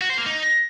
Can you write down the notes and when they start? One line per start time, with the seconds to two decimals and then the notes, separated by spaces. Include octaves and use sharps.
0.01 F#4
0.10 C5
0.18 A#3
0.26 D#4